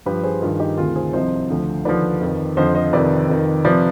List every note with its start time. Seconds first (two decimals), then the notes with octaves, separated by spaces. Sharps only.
0.06 G2 F3 G4 B4
0.23 G#4 C5
0.42 G2 D#3 F4 G#4
0.60 D#4 G4
0.77 D2 C3 D#3 F4 G#4
0.96 G#4 C5
1.13 C2 C3 F3 C5 D#5
1.50 D2 D3 F3
1.85 D#2 D3 F3 B4 D5
2.21 F2 D#3
2.57 F2 D3 F3 C5 D#5
2.75 C5 D#5
2.93 F2 C3 D#3 B4 D5
3.29 F2 D#3
3.65 C3 F3 B4 D5